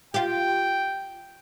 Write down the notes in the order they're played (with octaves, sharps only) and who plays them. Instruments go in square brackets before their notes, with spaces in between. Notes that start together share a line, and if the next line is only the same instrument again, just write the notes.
[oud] F4 G4 [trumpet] G5